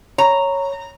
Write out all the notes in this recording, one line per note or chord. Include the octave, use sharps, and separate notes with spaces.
C#5 A#5